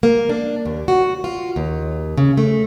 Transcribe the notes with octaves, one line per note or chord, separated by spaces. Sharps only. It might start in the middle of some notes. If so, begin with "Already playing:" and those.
A#3
D4
D#2
F#4
F4
D#2
C#3
A3